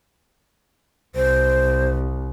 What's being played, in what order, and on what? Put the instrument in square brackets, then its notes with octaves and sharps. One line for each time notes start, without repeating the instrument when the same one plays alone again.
[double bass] C2 [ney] C5